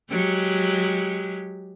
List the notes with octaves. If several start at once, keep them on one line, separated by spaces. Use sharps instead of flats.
F#3 G#3 G4